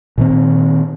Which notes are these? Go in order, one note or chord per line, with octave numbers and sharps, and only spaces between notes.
A#2 D#3 C4